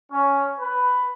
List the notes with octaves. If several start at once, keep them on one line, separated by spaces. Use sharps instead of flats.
C#4
B4